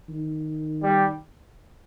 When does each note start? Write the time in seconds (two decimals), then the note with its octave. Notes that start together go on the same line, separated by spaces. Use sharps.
0.09 D#3
0.83 G3